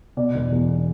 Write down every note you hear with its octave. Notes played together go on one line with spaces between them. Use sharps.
B2 D5
E1
E2